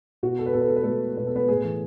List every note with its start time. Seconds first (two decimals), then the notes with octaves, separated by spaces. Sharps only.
0.23 B2 F#4
0.39 A4
0.46 B4
0.53 B2 A4
0.61 B4
0.68 A4
0.76 B4
0.83 B2 A3 A4
1.17 B2 B4
1.27 A4
1.36 B3 B4
1.48 A2 G#4
1.64 E3